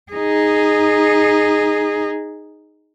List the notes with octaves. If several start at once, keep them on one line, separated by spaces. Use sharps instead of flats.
D#4 G#4